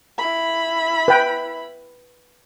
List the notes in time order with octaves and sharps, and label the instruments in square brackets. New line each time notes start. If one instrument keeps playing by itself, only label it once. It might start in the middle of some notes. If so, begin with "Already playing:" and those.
[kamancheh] E4 B5
[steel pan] B4 G5